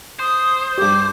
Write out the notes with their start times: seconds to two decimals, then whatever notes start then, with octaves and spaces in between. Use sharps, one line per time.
0.19 C5 D#6
0.78 G2 G4 D6